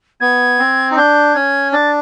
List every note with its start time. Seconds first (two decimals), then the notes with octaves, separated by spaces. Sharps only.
0.20 B3 G#6
0.59 C4
0.91 D#4
0.97 D4 G6
1.34 C#4 G#6
1.72 D4 A6